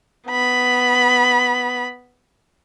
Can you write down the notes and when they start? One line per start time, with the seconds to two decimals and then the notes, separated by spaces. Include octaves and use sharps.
0.29 B3 B5